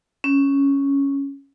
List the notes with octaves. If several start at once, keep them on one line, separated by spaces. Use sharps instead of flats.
C#4